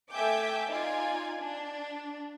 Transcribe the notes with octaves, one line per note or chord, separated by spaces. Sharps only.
A3 E5 G5 G#5 D6 G6
D#4 F4 D5 G#5
D4